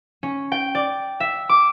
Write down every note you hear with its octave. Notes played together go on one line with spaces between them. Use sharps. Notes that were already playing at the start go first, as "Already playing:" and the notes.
C#4
G5
D5
E5
D6